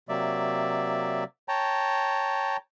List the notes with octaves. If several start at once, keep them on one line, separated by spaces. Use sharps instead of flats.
C3 F#3 A#3 D5 E5
C#5 G5 A5 A#5